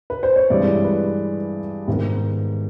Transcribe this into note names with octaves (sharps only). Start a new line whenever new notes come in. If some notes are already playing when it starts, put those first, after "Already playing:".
B4
C5
C#5
G2 E3 G#3 C4 D5
B4
G#2 D#3 G#3 B3